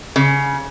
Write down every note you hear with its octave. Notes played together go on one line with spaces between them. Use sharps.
C#3